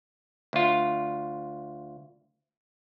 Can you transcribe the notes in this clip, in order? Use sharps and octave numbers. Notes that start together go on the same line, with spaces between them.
D2 F4